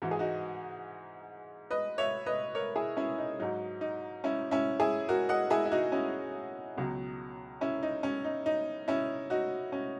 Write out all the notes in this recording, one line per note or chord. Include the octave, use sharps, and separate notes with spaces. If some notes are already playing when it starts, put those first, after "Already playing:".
G#2 E3 F#4
G#4
D#4 F#4
B4 D#5
C#5 E5
B4 D#5
A#4 C#5
E4 G#4
C#4 E4
D#4
G#2 F#3 D#4
D#4
C#4 E4
C#4 E4
E4 G#4
F#4 A#4
D#5 F#5
E4 G#4
E4
D#4 F#4
C#4 E4
C#2 B2 F#3
C#4 E4
D#4
C#4
D#4
D#4
C#4 E4
D#4 F#4
C#4